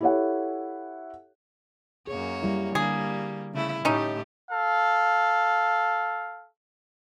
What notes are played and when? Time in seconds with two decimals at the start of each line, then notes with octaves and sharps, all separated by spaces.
0.01 E4 G4 A4 C#5 E5 F#5
2.07 F#2 A#3 G#4 C#5
2.43 G3 E4
2.75 D3 G3 A#3 D4 G#4
3.54 C#3 A3 E4
3.85 A2 A3 C#4 D#4 G4
4.51 A4 F5